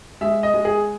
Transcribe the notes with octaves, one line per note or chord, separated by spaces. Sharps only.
G#3 E5
D#5
G#3
G#4